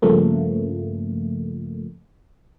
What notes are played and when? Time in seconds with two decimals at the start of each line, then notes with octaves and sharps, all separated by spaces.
0.02 G2 C#3 F3 A3 A#3